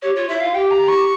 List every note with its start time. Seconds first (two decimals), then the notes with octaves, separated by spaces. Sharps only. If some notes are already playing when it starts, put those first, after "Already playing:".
0.02 G4 C#5
0.15 F4 C#5
0.29 E4 E5
0.41 F4 F5
0.54 G4 G5
0.71 A#5
0.88 C#6